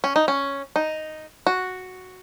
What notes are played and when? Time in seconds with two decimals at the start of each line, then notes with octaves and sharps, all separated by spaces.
0.04 C#4
0.16 D#4
0.28 C#4
0.76 D#4
1.47 F#4